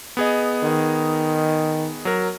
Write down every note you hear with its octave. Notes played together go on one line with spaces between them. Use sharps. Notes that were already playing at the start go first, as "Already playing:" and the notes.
B3 G#4 D#5
D#3
F#3 A#4